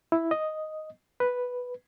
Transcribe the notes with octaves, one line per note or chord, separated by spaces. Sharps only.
E4
D#5
B4